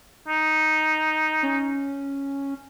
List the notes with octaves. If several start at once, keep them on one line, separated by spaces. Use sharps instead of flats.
D#4
C#4